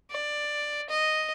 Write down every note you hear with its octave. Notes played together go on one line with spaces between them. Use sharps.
D5
D#5